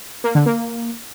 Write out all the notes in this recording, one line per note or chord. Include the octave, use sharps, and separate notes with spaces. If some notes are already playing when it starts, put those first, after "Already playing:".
A#3
D3
A#3